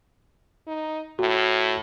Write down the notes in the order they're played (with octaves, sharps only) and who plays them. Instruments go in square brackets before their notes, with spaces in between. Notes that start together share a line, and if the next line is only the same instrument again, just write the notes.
[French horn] D#4
[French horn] A2 [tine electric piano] F#4